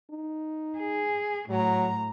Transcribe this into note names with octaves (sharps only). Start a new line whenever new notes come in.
D#4
G#4
A2 F#3 A#5